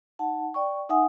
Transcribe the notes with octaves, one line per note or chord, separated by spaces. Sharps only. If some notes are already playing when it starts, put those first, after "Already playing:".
D#4 F#5 A5
D5 G5 C#6
D#4 E5 F#5 G#5 D#6